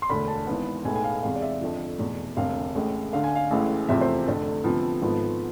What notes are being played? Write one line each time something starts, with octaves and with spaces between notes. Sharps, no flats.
C6
E1 D2 D3 B5
A5
G#1 G#2 E3 B3
B1 A2 G#3 B3 G#5
G#5
F5
E2 C3 G#3 F5
D5
E5
F2 D3 F3
F1 E2 B2
E1 D2 C3 F5
A1 A2 G#3
D2 D3 A3 F5
G#5
F5
A1 A2 E3 G#3
F1 E2 C3 F3 A3 E5
C5
F1 F2 D3 A3 A4
D2 C3 F3 B3
G#1 G#2 F3 B3 A4